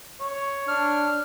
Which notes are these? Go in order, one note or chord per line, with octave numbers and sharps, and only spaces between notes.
C#5
D4 F6